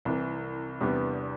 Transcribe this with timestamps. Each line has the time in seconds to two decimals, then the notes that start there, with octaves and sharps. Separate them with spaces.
0.05 C2 C3 E3
0.81 E2 C3 G3 B3 D4